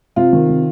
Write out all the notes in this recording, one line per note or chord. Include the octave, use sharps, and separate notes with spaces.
C3 F4
D#3
C3